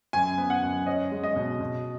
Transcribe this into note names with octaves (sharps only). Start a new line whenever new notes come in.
F#2 G#5
B3
F#5
F#2
C#4 D#5
G#3
D#5
B2
B2